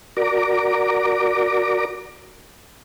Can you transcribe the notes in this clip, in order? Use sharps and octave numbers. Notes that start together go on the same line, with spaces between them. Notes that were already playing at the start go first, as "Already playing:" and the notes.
F#4 A#4 D5 A#5 D6